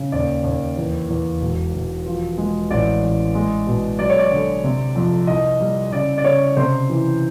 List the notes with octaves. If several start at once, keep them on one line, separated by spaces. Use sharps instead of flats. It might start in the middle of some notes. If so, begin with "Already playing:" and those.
Already playing: C#3
D#2 D5
D#2
E2
E2
E1
E1
F3
G#3
A1 D5
A1
G#3
B2
F#3 D5
C#5
D5
D3
C3
F2
C2 D#5
G3
C#3 D5
D5
C#3 C#5
C3 C5
E3